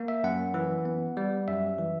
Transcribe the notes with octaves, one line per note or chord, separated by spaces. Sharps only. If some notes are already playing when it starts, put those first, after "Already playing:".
Already playing: A#3
E5
F#2 F#5
E3
B3
G3
F#2 E5
E3